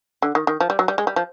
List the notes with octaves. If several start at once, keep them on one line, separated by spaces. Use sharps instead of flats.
D3
D#3
D#3
F3
G3
F#3
G3
G#3
G3
F3